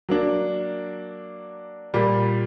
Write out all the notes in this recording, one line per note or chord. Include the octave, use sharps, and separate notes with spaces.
F#3 A#3 D4
A#2 G3 A#3